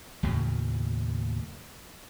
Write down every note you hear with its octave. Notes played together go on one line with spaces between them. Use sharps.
D#2 A2 C#3 F#3